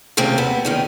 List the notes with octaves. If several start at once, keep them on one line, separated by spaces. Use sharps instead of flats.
D#2 C3 A3 A#3 C4 C#4
B3
D#3 C#4 D#4